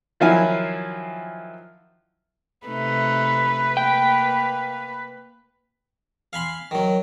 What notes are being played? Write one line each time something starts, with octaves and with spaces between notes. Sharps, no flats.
D#3 F3 F#3 E4 F5 G#5
C3 A3 D#4 B4
A#3 G5
F5 G#5 B5 C6
D#3 F#3